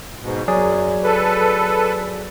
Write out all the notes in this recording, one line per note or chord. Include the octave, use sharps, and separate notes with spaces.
G#2 B2
F#2 F#3 G#4 D5
A4 B4